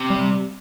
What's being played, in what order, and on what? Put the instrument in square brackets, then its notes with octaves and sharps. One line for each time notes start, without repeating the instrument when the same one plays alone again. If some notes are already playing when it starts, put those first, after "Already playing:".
Already playing: [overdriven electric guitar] C3
[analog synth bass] G3